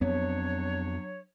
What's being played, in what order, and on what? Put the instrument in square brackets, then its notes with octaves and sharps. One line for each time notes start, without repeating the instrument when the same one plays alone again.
[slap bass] F2 B3 C4 [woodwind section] F#3 D4 C#5